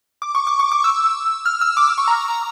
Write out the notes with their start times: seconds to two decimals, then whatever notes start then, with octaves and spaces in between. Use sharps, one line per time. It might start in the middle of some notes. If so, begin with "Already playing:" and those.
0.22 D6
0.35 C#6
0.47 D6
0.60 C#6
0.72 D6
0.84 E6
1.46 F6
1.61 E6
1.77 D6
1.87 D6
1.98 C#6
2.08 A#5